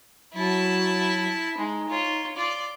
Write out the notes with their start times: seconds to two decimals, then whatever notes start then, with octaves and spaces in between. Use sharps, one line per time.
0.34 F#3 E4 A5
1.58 G#3 D#4
1.89 F4 C#5
2.36 F4 D5